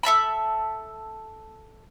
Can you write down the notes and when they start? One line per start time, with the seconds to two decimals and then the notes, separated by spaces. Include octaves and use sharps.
0.03 A4 E5 A5 B5